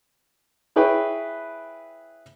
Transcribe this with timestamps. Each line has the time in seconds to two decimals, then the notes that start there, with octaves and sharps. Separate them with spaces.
0.76 E4 G#4 B4 C#5 G5